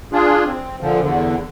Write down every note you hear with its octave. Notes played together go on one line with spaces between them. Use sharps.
D4 F4 G#4
C4
A#2 D3 F3
E2 D3